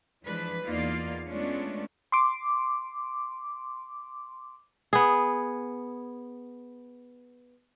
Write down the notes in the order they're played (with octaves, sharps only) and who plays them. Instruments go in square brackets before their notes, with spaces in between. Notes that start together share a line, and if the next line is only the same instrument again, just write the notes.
[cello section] E3 F3 G#3 D4 B4
E2 A#3 D#4 F4 D5 F5
G#3 A3 B3 C#4 D4 F4
[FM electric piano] C6 D6
[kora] B3 G#4